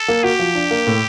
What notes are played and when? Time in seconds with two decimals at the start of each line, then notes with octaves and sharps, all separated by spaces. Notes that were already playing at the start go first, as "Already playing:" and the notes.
Already playing: A4
0.08 A#3
0.23 F#4 G4
0.39 F3
0.55 D4
0.71 A#3
0.87 A2